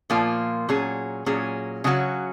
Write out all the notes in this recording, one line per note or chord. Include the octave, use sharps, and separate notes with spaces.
A#2 F3 A#3 F4
A#2 F#3 C#4 G#4
A#2 F#3 C#4 G#4
C#3 F#3 C#4 F#4